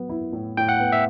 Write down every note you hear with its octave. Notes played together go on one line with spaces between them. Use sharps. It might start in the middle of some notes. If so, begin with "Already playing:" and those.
Already playing: F#3 B3
E4
A2
A2 G5
F#5
B3
E5